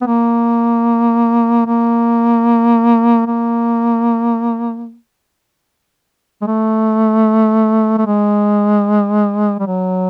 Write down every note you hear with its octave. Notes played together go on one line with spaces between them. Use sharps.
B3
A#3
A#3
A#3
G#3
A3
A3
G#3
G3
F#3